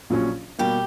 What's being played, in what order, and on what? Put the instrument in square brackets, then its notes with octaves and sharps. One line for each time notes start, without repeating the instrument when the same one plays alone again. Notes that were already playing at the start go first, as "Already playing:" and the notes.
[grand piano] A#1 A#2 F#3 C#4
[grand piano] B2 G3 A#3 [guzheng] G4